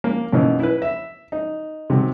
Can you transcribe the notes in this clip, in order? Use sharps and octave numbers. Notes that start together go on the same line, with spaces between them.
A#3
F#2 B2 E3 A#3 D#4
E4 B4
E5
D#4
C3 D#3 F#3